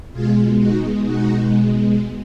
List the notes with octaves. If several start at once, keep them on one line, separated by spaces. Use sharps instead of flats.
B2 G#3 F4 G#4
D#4 F#4
D#4 F#4